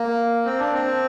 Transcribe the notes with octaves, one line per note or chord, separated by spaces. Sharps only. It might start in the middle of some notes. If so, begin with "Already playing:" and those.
Already playing: A#3
C4
D4
C4